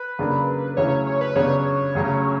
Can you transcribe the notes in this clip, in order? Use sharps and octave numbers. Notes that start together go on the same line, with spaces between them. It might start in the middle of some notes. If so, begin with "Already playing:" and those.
Already playing: B4
C#3 F#3 A#3 D4
D2 C#3 F#3 C#4 E4 C#5
C#5
B4
C#3 F#3 B3 D4 C#5
D2 C#3 F#3 C#4